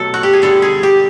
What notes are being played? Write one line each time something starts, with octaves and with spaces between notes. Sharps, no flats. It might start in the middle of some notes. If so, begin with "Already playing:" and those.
Already playing: B2 F#3 A3 A4
F#4
G4
G#4
D3 G3 A4
G#4
G4